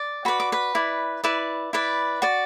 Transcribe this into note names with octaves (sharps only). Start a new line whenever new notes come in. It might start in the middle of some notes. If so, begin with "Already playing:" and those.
Already playing: D5
F#4 B4 D5 B5
D6
B4 B5
E4 D5
E4 B4 D5
E4 B4 D5
F#4 D5